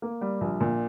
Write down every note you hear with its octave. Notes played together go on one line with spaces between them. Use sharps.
A#3
G3
A#1
A#2